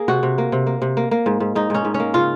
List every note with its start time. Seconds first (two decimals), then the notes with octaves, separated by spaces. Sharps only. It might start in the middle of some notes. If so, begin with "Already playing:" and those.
Already playing: A#3 G#4
0.08 C3 F#4
0.23 C3
0.38 A#3
0.52 C3
0.67 A#3
0.82 C3
0.97 A#3
1.11 A#3
1.26 G#2
1.40 G#2
1.55 G#2 D#4
1.70 G#2 C#4
1.85 G#2
1.94 C#4
2.00 A#3
2.14 C#3 F4